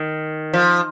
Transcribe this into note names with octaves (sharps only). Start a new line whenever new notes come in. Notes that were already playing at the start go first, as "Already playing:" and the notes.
Already playing: D#3
F3